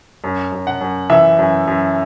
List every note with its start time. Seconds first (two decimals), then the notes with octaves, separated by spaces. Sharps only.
0.24 F#2
0.52 F#2
0.67 F#5
0.81 F#2
1.10 E3 E5
1.39 F#2
1.68 F#2